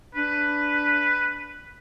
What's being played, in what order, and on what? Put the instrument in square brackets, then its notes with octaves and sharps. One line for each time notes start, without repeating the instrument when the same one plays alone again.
[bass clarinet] D4 [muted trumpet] B4